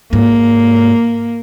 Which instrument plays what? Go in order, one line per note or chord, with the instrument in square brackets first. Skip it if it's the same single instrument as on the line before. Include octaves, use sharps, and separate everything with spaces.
[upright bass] G#2 [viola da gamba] A#3